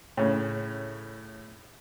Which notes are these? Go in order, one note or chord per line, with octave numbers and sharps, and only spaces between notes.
A2 C#3